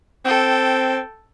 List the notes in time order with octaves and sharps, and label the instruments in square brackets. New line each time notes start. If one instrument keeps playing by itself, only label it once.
[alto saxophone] C4 [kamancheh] A4 G5